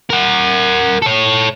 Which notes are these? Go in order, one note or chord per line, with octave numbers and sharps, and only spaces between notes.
A#4 F#5
A4 C#5